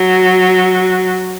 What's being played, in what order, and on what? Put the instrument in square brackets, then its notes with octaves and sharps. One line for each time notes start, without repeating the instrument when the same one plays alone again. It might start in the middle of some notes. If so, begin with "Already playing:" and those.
Already playing: [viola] F#3